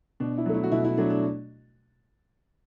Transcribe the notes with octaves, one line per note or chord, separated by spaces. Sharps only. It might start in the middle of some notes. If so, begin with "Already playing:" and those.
B2 D4
E4
F#3 A3
E4
F#4
B2 E4
E4
F#3 A3 D4
D4